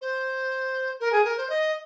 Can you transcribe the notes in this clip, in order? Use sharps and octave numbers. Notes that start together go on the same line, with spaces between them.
C5
A#4
G#4
A#4
C5
D#5